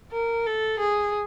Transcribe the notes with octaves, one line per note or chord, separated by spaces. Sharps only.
A#4
A4
G#4